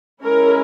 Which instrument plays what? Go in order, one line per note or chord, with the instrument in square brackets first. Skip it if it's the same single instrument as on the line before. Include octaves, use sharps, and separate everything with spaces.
[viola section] G#3 C#4 E4 A#4